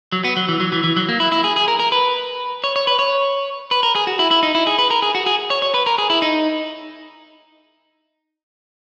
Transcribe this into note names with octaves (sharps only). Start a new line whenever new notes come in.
F#3
B3
F#3
E3
F#3
E3
E3
F#3
A#3
E4
E4
G#4
G#4
A#4
A#4
B4
C#5
C#5
B4
C#5
B4
A#4
G#4
F#4
E4
E4
D#4
E4
G#4
B4
A#4
G#4
F#4
G#4
C#5
C#5
B4
A#4
G#4
E4
D#4